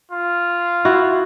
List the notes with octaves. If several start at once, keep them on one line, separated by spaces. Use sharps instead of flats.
F4
E4 F#4